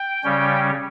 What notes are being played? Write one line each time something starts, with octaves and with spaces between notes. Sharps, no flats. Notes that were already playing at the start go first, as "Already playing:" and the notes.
Already playing: G5
C#3 G3 C#4